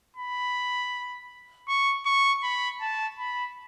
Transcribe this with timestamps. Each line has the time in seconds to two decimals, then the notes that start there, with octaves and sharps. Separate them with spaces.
0.16 B5
1.68 C#6
2.06 C#6
2.43 B5
2.81 A5
3.19 B5